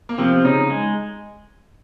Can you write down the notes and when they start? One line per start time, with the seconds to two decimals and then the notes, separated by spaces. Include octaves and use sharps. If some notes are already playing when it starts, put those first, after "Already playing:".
0.09 A#3
0.18 C3 F3 C4
0.44 C#3 C#4 D#4
0.70 G#3